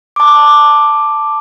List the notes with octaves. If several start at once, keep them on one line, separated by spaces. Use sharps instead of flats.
A5 D6